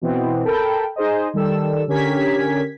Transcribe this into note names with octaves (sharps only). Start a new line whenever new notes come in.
B2 E3 B3 C4
A4 A#4 G5 A5 B5
D#4 G#4 C5 D#5
D#3 G3 A4 E6
D3 C#4 G4 A#4 G#6 B6